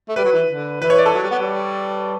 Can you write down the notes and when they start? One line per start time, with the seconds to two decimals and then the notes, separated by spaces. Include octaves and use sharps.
0.09 A3
0.16 G3 B4
0.24 F#3
0.33 E3
0.49 D3
0.81 E3 B4
0.90 C#5
0.98 D5
1.06 A4
1.14 F#3
1.23 G3
1.31 B3
1.39 G3